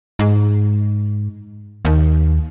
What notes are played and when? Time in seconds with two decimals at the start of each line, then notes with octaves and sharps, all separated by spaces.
0.19 G#2
1.85 D#2